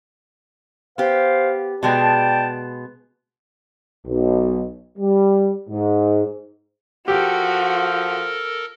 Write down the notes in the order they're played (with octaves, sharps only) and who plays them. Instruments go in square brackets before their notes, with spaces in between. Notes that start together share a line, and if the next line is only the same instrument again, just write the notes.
[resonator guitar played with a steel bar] B3 G4 [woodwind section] C5 F5
[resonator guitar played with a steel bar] B2 G#3 B3 [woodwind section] D5 G5 A5
[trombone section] B1
G3
G#2
[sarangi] F3 [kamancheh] F#4 [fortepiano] G4 [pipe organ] A4 A#4